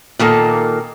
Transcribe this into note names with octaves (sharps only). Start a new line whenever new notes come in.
A#2 D#3 A#3 A4